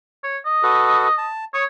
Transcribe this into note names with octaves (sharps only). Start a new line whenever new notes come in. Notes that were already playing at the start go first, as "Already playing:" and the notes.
C#5
D#5
F#4 A4 B4
A5
C#5 C#6 D#6